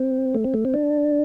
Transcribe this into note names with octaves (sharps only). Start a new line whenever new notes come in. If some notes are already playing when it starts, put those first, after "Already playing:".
Already playing: C4
A3
C4
A3
C4
D4